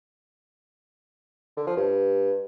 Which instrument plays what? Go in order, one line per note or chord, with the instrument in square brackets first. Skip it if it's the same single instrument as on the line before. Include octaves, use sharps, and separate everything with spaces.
[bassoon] D3
F3
G2